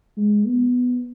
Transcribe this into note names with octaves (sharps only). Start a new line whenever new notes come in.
G#3
B3